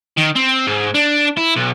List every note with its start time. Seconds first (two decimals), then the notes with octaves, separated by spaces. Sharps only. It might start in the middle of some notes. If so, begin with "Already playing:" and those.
0.18 D#3
0.36 C4
0.67 G#2
0.94 D4
1.37 E4
1.56 B1